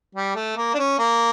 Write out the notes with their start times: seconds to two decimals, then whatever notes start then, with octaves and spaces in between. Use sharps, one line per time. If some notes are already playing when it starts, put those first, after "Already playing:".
0.15 G3
0.35 A3
0.56 A#3
0.74 D4
0.79 C#4
0.99 A#3